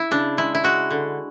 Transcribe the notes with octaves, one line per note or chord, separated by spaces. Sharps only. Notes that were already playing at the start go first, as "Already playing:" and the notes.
Already playing: E4
C#3 D4
G#3 E4
E4
G#3 F#4
D3